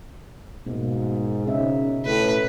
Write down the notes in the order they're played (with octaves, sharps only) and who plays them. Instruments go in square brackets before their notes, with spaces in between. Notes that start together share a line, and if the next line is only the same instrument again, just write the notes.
[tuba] G#2 [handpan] B2 A#3
[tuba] C#3 [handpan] C#4 D#4 E5
[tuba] A2 [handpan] C#4 A4 [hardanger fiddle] B4